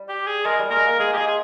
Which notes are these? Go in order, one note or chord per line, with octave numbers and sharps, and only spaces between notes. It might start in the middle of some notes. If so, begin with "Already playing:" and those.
Already playing: G3
G4
G#4
G#3 A#4
G3
G#3 A#4
A#3
G#3 G#4
G4
G#3 G#4
G#4